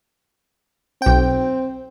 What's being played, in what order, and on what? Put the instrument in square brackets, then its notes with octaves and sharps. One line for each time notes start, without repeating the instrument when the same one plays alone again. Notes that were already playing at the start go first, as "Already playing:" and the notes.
[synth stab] B1 G5 [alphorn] C4